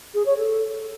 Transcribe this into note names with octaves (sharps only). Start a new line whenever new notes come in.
G#4
C#5
A4